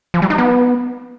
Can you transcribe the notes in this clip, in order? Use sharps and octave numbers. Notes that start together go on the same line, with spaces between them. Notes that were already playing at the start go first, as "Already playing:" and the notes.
F3
G3
D#4
B3